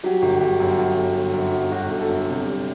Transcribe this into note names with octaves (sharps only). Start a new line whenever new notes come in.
F#3 G4
G1
G1 G4
F#2
F#3
G1
G1
F#2
F#3
G1 F#4
G1
F#4 A4
F#2
C3
G3